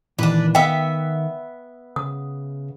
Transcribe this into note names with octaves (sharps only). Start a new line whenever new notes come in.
A#2 D#3 E3 D4 B4
B3 E5 F5 G5
C#3 D#6